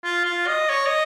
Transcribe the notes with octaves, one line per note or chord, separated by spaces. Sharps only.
F4
F4
D#5
C#5
D#5